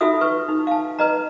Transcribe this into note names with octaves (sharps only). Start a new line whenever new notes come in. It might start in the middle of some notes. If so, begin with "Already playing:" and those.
D#4 F4 F#4 A4 E5 D#6
B4 C#6
D#4
F5 A5
B4 D#5 A#5